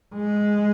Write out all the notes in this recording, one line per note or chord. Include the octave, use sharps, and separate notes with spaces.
G#3